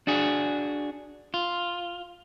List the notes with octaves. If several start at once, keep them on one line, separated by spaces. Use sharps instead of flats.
D4 F#4 G#4
F4